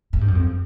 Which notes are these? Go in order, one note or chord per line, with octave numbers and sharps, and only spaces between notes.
G#2
G2
F#2
F2